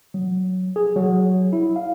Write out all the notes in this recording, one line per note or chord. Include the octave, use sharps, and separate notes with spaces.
F#3
G#4
F#3
E4
F5